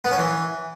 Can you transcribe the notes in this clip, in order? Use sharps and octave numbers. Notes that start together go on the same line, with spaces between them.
B3
C#4
E3